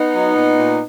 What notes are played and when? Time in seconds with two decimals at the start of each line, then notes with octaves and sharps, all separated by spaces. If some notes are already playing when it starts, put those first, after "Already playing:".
Already playing: B3 D#4
0.14 F#3
0.36 A#2
0.57 A#2